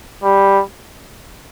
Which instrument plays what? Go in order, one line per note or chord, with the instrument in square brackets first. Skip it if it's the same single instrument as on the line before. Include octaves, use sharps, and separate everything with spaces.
[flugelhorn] G3